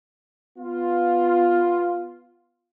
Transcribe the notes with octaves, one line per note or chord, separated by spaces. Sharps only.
B3 F4